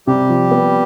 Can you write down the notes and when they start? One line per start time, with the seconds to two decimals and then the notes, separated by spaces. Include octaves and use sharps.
0.07 C3 G3 G4
0.29 F3
0.51 B3